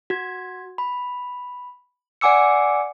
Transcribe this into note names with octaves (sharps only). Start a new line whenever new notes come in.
F#4 G#6
B5
D5 F#5 G#5 D6 E6 C#7